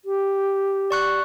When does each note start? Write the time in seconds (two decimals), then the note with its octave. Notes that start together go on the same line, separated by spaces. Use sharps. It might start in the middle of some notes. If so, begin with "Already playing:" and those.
0.05 G4
0.91 D5 C#6 F#6